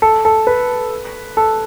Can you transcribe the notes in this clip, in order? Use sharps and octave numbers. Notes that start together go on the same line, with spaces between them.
A4
A4
B4
A4